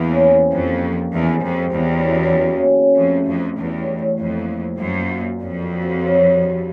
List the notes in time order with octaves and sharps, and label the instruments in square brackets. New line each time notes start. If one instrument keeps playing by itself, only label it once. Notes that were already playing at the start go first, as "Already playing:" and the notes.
Already playing: [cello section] E2 [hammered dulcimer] E3 A#3
[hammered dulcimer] C#4
C3
[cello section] F2 [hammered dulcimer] A#3
[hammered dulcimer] D#3
D#3
[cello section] E2 [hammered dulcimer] G#3
[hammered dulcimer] C3
[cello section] F2
[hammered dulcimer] C3
[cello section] E2 [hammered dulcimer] G3
[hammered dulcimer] F#2
F#2
A#3
C#3
C#3
[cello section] F2 [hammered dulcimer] A3
[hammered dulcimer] G2
[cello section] F2
[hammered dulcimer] G2
[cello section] E2 [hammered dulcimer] G3
[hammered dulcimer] A2
A2
[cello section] F2 [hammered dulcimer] A#3
[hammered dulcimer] D#4
C3
[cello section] F#2 [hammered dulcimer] A#3
[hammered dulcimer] A#2
A#2
[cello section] F2 [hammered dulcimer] D4
[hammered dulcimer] F#4
F3
F#3
G2
G2